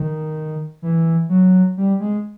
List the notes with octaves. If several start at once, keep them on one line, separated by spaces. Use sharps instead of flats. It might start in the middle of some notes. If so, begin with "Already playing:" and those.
Already playing: D#3
E3
F#3
G3
G#3